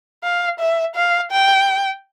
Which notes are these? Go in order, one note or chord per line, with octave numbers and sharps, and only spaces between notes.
F5
E5
F5
G5